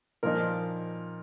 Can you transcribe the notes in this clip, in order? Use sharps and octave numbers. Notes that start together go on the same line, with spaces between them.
A#2 F3 D#4 A#4